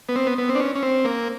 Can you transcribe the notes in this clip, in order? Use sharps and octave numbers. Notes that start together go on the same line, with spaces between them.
B3
C4
B3
B3
C4
D4
C#4
C#4
C4
A#3